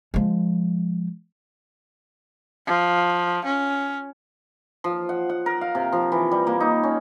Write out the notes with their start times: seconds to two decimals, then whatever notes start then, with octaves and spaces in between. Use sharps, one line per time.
0.14 F3 G#3
2.67 F3
3.45 C#4
4.84 F3
5.09 F#5
5.29 F#5
5.46 A#4
5.61 F5
5.75 C3
5.92 F3
6.12 E3
6.31 G3
6.47 A#3
6.60 D#4
6.83 C#4